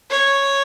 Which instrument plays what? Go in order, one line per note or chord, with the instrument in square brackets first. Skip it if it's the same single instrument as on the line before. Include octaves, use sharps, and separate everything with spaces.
[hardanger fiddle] C#5